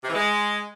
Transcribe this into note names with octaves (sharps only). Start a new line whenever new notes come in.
C3
E3
G#3